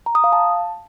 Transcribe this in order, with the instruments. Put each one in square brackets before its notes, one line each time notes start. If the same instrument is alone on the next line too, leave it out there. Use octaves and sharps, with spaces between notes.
[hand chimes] A#5
D#6
F5
A5